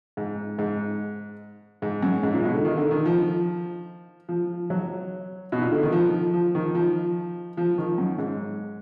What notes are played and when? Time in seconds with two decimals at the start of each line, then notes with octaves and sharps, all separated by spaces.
0.17 G#2
0.58 G#2
1.82 G#2
2.03 F#2
2.23 G#2
2.34 A#2
2.44 B2
2.54 D3
2.65 D#3
2.77 D3
2.91 D#3
3.06 F3
4.29 F3
4.70 F#3
5.52 B2
5.62 A#2
5.72 D3
5.83 D#3
5.92 F3
6.33 F3
6.55 D#3
6.75 F3
7.57 F3
7.78 D#3
7.98 F#2
8.18 G#2